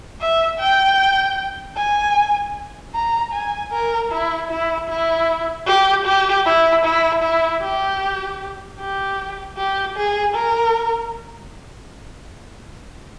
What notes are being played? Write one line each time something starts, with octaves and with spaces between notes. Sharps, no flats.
E5
G5
G#5
A#5
G#5
A#4
E4
E4
E4
G4
G4
E4
E4
E4
G4
G4
G4
G#4
A#4